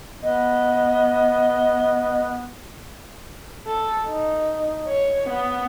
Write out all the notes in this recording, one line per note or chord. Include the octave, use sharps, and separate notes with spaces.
B3 D#5
A4
D#4
C#5
B3